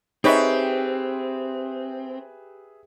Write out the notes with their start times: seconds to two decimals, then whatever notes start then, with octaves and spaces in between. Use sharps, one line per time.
0.24 C4 D#4 G4 G#4 B4 C#5 E5 B5